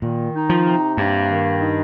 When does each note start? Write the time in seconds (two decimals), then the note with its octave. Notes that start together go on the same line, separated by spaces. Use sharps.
0.02 A#2 D#3
0.34 D#4
0.49 F3
0.66 C3
0.97 G2 A#3
1.28 D#3
1.60 D#4